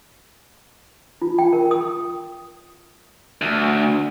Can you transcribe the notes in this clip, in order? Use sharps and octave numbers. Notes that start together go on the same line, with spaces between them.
F4
G5
A#4
D#6
D2